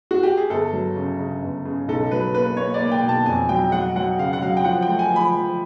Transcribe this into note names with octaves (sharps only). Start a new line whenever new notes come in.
F#4
G4
G#4
G1 A4
F#3
C#3
C#3
G1
C#3
B1 A4
F#3 B4
A#3 B4
A#3 C#5
D5
A#3
G5
B2
A5
F2 G#5
F#3 G5
F#3 F#5
F#3 F#5
C#3 F5
F#5
F#3 F5
G5
F3 F#5
G5
A3
G#5
F3
B5
F3